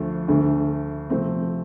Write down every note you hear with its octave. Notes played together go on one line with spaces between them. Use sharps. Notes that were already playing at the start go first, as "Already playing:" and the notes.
Already playing: D2 D3 F3 A3
D2 D3 A3
C3 F3 A3 C4